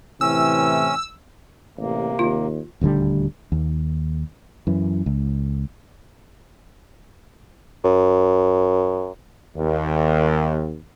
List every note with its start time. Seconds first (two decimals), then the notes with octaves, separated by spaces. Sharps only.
0.21 A2 C3 E3 C#4 E6
1.77 A1 C3 A#3
2.19 D#2 F4
2.81 D#1 D2 D3 G3
3.52 D#2
4.67 F#2 E3
5.06 C#2
7.84 F#2
9.57 D#2